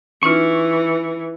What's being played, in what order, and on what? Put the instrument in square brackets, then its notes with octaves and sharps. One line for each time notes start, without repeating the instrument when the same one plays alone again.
[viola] E3 [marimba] C#4 D#4 F4 [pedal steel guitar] C#6